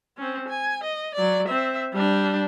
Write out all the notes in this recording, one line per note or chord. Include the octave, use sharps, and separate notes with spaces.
C4 C#4
G#5
D#5
F#3 D5
C4 E5
G3 D4